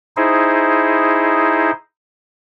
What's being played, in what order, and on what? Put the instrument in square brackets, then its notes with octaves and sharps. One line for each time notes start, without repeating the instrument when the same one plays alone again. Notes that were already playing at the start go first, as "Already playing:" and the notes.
[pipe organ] D#4 E4 G#4 C5